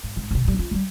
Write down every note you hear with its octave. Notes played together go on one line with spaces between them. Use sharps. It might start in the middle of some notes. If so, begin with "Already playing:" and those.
G#2
G#1 C4
G2 C3
A2 G3
C#4 F4
G3 G#3